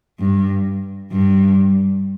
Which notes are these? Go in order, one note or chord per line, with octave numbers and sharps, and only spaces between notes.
G2
G2